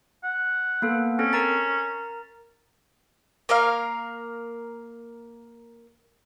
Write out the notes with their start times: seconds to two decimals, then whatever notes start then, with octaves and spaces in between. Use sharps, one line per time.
0.24 F#5
0.82 A#3 B3 A4
1.19 C4 C#4 A4
1.33 A#4 A#5 A6
3.49 A#3 A#4 F5